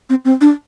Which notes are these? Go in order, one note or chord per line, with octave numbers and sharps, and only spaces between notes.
C4
C4
D4